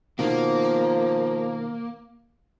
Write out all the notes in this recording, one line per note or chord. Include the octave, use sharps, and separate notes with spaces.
B2 D#3 F3 A#3